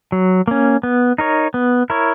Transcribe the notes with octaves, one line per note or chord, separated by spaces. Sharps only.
F#3
A#3 C#4
B3
D#4 A#4 C#5
B3
E4 A#4 C#5